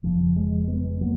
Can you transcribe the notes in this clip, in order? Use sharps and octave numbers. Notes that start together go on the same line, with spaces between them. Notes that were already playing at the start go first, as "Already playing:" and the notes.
F#1 F2 C#3 F3
F3 G#3
G#3 B3
F#3 A#3